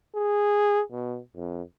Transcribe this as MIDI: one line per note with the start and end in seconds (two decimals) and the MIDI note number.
0.15 0.81 68
0.91 1.19 47
1.35 1.62 41